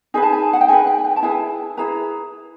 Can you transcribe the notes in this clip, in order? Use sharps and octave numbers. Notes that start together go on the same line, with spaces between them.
D#4 G#4 B4 G#5
A5
G#5
F#5
G5
D#4 G#4 B4 G#5
G5
G#5
G5
A5
E4 G#4 B4 G#5
E4 G#4 B4 A#5